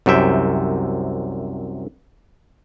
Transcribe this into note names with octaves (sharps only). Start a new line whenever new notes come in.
C2 F#2 C3 E5 G5